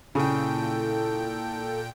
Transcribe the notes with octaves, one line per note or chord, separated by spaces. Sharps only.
A#2 C#3 E4 A4 G5